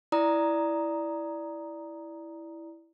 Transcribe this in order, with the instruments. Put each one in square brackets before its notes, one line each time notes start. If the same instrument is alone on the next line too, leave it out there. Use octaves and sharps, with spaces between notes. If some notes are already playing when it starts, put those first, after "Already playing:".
[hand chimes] E4 D5 A#5 D#6